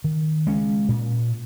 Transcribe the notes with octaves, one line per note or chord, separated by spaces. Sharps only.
D#3
G#3 C#4
A#2